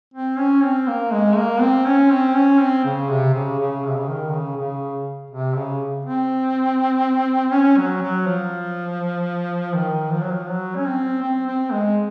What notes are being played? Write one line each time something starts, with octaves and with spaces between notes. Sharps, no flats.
C4
C#4
C4
A#3
G#3
A#3
C4
C#4
C4
C#4
C4
C#3
C3
C#3
C#3
C3
C#3
D#3
C#3
C#3
C3
C#3
C4
C#4
F#3
F#3
F3
D#3
F3
F#3
F3
F#3
C#4
C4
C4
C4
G#3